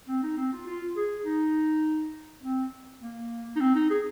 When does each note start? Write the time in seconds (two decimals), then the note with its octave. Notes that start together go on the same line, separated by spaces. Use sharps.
0.08 C4
0.23 D#4
0.37 C4
0.53 F4
0.67 F4
0.96 G#4
1.25 D#4
2.43 C4
3.01 A#3
3.56 D#4
3.60 C4
3.75 D#4
3.90 G#4